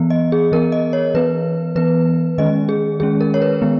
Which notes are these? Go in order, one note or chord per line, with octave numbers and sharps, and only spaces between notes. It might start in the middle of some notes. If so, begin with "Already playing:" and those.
Already playing: E3 B3
D#5
G#4
E3 B3 A#4
D#5
C#5
E3 B3 B4
E3 B3 B4
D#3 G#3 C#4 D#5
G#4
D#3 G#3 C#4 G#4
A#4
C#5
B4
D#3 G#3 B3